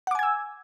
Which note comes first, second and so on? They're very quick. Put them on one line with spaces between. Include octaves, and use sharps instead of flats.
F#5 D6 G#5 G#6 E6